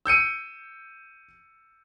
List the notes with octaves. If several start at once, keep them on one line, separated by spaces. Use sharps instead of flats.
E6 G6 C#7 D#7